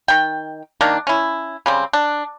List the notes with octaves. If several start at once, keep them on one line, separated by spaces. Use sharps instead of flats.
D#3 G5
D#3 A#3 D4
C#4 E4
C#3 G3 C4
D4